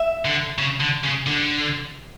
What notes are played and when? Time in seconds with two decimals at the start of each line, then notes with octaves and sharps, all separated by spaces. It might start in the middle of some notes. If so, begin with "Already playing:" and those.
Already playing: E5
0.25 D3
0.58 C#3
0.81 D3
1.04 C#3
1.26 D3